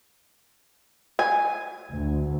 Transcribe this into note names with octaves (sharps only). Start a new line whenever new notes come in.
G#5
D2